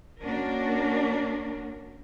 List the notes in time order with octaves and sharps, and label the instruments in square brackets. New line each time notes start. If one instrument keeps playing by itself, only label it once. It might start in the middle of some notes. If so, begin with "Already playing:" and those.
[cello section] A#3 C#4 D4 F#4 A#4